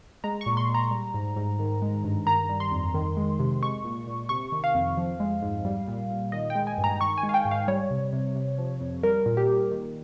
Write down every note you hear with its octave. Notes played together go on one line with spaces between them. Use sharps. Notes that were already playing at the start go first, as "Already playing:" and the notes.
G#3 A#5
C#6
A#2
C6
A#2
A#5
G3
G#2
G#2
D#3
G#3
G2
D#3 A#5
G3
C6
F2
D#3
G#3
C3
G#3 C#6
A#2
A#2
C3 C#6
D#3
F5
F2
F3
G#3
G#2
G3
A#2
A#2
D#3 D#5
G5
G#3
G#5
G2
A#5
D#3 C#6
G#5
G#3
F5
G5
G#2
F5
G3 C#5
C3
C3
C3
F3
F2
G3 A#4
A#2
G4
A#2
D#3